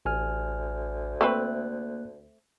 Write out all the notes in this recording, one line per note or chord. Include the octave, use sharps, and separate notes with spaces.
A1 D2 G#5 F6
A3 A#3 C4 B4 F#6